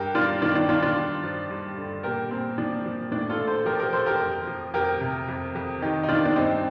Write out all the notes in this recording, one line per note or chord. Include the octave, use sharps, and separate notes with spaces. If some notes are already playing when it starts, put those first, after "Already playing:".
Already playing: G2 G4 A#4
G2 D4 F4
D#3 D4 F4
D4
D#3 D4 F4
D4 F4
G2
F3
G2
D3
A#2 G4 A#4
A#2 C4
F3 D4
F3
A2 D4
F4 A4
A2
A4 C5
F3 G4 A#4
G4 A#4
F3 A4 C5
G4 A#4
F2
F3
F2 G4 A#4
C3
F2
F2
D#3 D#4 G4
D#4
D#3 D4 F4
D4
G2 C4 D#4